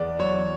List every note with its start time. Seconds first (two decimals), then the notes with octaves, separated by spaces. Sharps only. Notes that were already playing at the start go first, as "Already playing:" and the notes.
Already playing: E2 B3 D5
0.19 F#3 C#5